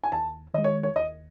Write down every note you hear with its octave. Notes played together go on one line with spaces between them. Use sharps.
G#5
D#2 A5
D#3 G#3 D#5
C#5
C#5
D#2 D#5